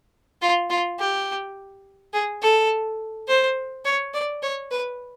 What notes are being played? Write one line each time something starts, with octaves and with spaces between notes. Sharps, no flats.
F4
F4
G4
G#4
A4
C5
C#5
D5
C#5
B4